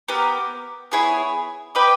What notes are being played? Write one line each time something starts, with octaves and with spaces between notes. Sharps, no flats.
B3 G4 A#4
B3 E4 G#4 C#5
G4 B4 D#5 G5